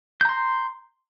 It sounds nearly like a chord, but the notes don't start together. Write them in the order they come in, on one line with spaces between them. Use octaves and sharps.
G6 A#5 C6